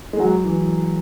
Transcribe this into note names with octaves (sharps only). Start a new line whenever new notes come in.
G#3
F#3
E3